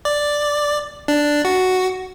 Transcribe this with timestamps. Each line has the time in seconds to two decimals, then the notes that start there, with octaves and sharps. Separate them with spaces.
0.05 D5
1.08 D4
1.45 F#4